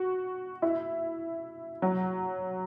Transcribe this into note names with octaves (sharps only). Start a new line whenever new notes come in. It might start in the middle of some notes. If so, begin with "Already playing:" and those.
Already playing: F#4
E4
F#3